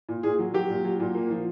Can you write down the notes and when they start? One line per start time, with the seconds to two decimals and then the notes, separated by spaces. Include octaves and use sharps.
0.09 A#2
0.23 A#2 G#4
0.39 F#3
0.54 F#3 G4
0.70 A#2
0.85 F#3
1.00 A#2
1.14 A#3
1.31 F3